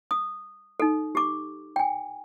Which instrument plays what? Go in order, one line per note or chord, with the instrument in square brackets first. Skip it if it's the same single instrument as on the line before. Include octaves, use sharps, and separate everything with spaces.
[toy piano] D#6
D#4 A4
G4 D6
G5 G#5